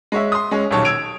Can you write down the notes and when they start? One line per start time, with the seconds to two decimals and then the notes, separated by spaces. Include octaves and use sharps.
0.12 G#3 C#5 E5
0.32 C6 D#6
0.51 G#3 C#4
0.71 D#1 B1 C#5 A5
0.85 E6 G#6 D7 F7